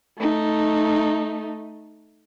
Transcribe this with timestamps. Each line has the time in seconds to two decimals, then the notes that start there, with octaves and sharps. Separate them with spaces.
0.18 A3 D#4